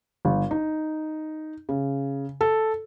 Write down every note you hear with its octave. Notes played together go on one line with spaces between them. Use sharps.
G1
D#4
C#3
A4